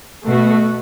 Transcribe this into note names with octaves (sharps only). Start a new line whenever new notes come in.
B2 A3 F#4